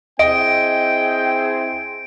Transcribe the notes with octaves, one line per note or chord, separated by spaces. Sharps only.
C4 E4 G#4 D#5 G5 D7